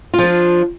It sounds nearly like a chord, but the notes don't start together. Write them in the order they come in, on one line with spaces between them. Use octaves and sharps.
F4 F3 D4